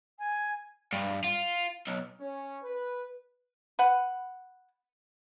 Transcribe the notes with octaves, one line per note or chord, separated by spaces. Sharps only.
G#5
G2
F4
B1
C#4
B4
B4 F#5